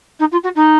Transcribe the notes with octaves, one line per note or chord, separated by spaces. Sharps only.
D#4
F4
F#4
D#4